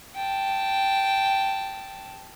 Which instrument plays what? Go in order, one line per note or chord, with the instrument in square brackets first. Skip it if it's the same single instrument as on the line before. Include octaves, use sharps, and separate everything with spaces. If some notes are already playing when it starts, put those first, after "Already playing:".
[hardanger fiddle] G5 A5